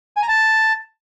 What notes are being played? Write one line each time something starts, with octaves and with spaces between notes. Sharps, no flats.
G#5
A#5
A5